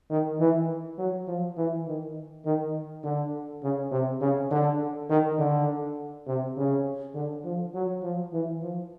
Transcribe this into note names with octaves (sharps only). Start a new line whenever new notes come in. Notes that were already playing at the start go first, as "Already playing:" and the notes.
D#3
E3
F#3
F3
E3
D#3
D#3
D3
C#3
C3
C#3
D3
D#3
D3
C3
C#3
D3
F3
F#3
F3
E3
F3